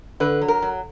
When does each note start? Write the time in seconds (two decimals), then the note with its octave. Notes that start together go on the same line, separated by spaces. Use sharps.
0.20 D3 B4
0.41 F#3
0.48 A#4
0.62 F#3